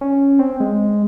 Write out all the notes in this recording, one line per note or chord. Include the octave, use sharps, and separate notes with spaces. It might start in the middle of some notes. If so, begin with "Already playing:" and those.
C#4
C4
G#3